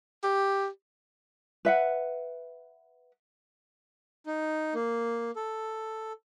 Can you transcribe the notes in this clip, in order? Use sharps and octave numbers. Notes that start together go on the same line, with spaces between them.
G4
B4 E5 F#5
D#4
A#3
A4